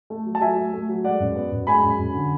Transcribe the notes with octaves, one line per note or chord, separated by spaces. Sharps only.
A3
F#3
A5
F#3 E5 G#5
A3
A3
F#3
G#3 D5 F#5
F#2
B3
F#2
G#3 G#5 B5
F#2
F#2
D3